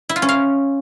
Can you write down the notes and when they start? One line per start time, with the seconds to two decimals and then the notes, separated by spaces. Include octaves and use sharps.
0.09 E4
0.16 F4
0.22 C#4
0.29 F5